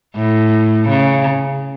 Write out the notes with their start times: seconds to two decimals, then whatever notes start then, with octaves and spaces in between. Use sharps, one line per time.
0.16 A2
0.89 C#3